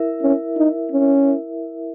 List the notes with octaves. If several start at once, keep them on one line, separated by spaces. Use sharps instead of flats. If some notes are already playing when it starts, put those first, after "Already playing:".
Already playing: E4 A#4 E5
C#4
D#4
C#4